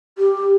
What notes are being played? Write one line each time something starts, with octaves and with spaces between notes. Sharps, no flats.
G4